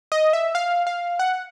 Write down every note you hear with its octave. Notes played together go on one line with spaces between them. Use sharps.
D#5
E5
F5
F5
F#5